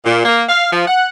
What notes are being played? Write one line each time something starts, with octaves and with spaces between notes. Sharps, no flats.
A#2
A#3
F5
F3
F#5